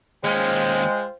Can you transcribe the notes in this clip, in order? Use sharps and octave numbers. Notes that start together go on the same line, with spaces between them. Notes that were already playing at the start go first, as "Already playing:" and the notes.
D#2 G#3 C#4 F4 C5 G5